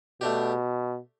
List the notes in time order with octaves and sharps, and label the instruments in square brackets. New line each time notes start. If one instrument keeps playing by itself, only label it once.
[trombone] B2 [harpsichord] A3 D4 G4